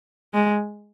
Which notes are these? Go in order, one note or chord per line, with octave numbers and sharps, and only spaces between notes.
G#3